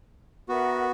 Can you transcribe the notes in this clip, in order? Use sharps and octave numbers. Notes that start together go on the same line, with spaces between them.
B3 F#4 A#4 E5 F#5